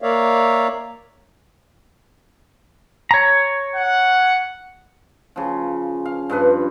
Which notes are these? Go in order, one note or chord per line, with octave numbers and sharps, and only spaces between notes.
A#3 A#4 C#5 D5 E5 F5
C#5 A#5
F#5
C#3 F3
F5
G2 F3 B4